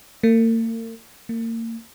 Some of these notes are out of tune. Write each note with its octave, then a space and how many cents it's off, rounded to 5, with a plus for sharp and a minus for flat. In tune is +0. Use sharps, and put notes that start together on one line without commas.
A#3 -45
A#3 -35